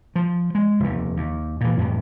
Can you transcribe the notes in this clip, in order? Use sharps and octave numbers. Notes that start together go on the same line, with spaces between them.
F3
G#3
F1 D#2
D#2
A#2 E3
F2 A2 C3 E3